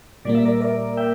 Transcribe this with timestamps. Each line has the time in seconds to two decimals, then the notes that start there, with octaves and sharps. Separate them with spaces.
0.25 A#2 G3 A#3 D5
0.35 E5
0.45 A#4 D5
0.61 A#4 D5
0.97 E5 G5